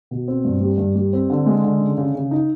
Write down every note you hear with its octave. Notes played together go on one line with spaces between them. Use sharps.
B2
C4
G2
G3
G2
G3
C4
D3
G#3
D3
C#3
C#3
C#3
D#4